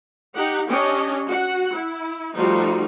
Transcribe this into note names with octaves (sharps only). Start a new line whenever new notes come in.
D#4 G4 F#5
C#4 D4 G4 C#5 D#5
F#4 F#5
E4
F3 G3 A3 D#4 F4 F#4